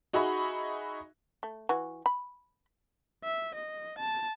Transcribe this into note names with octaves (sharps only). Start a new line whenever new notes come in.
D#4 F#4 G#4 E5 B5 C#6
A3
E3 F#4
B5
E5
D#5
A5